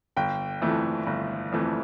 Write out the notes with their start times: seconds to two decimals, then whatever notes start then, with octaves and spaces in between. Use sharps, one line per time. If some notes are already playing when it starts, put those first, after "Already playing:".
0.16 G1 G5
0.61 F2 E3 A3
1.06 G1
1.52 F2 E3 A3